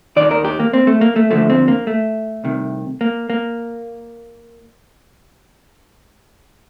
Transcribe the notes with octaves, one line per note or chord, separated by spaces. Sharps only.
D#2 D#3 D5
A#4
G4
A#3
C4
A3
A#3
A3
D#2 D3 F3 A3
C4
A#3
A3
C2 C3 D#3
A#3
A#3